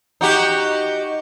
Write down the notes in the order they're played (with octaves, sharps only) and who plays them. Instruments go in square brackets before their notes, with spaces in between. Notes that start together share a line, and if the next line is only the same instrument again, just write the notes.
[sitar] D#4 F#4 G4